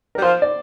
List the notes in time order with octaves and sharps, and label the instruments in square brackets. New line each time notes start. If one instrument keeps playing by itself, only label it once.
[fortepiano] A#4
[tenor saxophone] G3
[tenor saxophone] F3 [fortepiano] C5
[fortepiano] D5